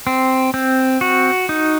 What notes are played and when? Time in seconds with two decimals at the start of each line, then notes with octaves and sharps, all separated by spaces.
0.07 C4
0.54 C4
1.01 F#4
1.49 D#4